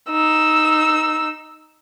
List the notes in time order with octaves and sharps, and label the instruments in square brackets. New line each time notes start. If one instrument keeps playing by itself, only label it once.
[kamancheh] D#4 E6